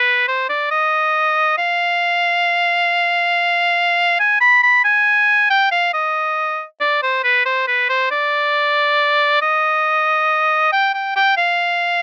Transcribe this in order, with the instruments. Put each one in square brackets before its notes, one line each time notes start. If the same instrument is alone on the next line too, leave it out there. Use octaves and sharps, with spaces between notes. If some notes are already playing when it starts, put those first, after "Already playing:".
Already playing: [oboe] B4
C5
D5
D#5
F5
G#5
B5
B5
G#5
G5
F5
D#5
D5
C5
B4
C5
B4
C5
D5
D#5
G5
G5
G5
F5